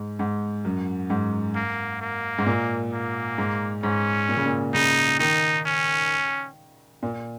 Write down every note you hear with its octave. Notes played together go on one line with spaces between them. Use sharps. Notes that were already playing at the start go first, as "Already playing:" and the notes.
Already playing: G#2
G#2
F#2
G#2
A#3
A#3
G#2
A#2
A#3
G#2
G#2 C#4
A#2
C#3
A#2
C#3 D#4
D#3 D#4
C#4
A#2